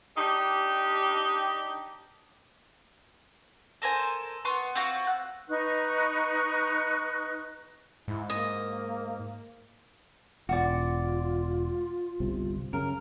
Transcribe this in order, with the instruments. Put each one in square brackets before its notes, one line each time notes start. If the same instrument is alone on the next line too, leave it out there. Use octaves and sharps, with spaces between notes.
[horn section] D4 D#4 G4
[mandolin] A4 A#4 C5 G#5
B3 C6 C#6
C4 F4 F#4 F#5
F#6
[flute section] D#4 B4 C#6 F#6
[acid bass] G#2 [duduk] E4
[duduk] A#3 [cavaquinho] D#5
[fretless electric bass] E1 [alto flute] F4 [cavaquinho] F#4 D5
[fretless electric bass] G1 C2 C3
[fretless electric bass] F#2 C#3 [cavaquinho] A#4